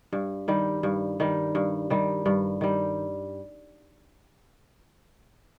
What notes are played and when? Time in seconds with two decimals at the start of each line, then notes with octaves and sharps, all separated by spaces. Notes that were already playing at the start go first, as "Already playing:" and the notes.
0.13 G2
0.48 D#3 G3
0.83 G2
1.20 D#3 G3
1.55 G2
1.90 D#3 G3
2.26 G2
2.61 D#3 G3